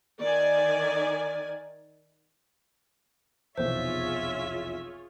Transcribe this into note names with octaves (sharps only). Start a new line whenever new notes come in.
D#3 D5 G#5
F1 B1 E2 F4 G#4 C5 C#5 E5